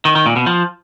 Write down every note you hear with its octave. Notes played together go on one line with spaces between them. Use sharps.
D#3
D#3
A#2
B2
F3